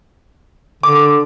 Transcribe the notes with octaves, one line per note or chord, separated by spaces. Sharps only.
D3 D6